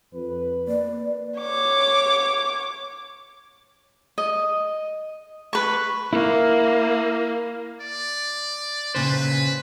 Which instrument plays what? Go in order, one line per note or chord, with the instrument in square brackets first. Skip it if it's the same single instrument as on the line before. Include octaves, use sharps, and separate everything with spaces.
[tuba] F2 [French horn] B4
[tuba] A#3 [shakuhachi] D5
[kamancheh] C#5 D6
[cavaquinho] D#5
B4 C#6
[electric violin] A#3 [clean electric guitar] E4
[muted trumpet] D5
[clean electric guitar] A#2 C#3 C5 [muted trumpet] B4